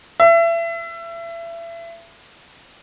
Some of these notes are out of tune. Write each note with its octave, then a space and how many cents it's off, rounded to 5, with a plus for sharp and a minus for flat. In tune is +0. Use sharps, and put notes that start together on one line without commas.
E5 +30